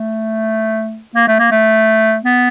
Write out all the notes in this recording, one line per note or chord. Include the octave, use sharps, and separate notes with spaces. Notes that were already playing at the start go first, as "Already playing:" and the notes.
Already playing: A3
A#3
A3
A#3
A3
B3